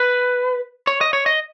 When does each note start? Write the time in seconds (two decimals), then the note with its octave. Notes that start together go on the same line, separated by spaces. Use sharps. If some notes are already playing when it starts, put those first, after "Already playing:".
Already playing: B4
0.87 C#5
1.01 D#5
1.13 C#5
1.26 D#5